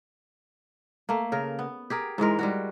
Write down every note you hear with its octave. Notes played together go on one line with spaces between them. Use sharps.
A3 A#3
C#3 A#4
B3
G4 G#4 A#4
G#2 E3 G#3 A#4
G3 G#3 F#4